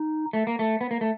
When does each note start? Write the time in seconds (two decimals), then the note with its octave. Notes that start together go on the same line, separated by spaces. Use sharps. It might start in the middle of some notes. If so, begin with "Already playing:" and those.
Already playing: D#4
0.33 A3
0.47 A#3
0.59 A3
0.81 B3
0.91 A#3
1.01 A3